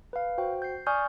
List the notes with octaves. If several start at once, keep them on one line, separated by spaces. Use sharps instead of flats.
B4 F5
F#4 C5 G5
G6 C7
D5 G#5 C#6 D#6 F6 G6